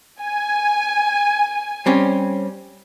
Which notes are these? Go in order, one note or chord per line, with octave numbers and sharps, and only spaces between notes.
G#5
G3 C4 C#4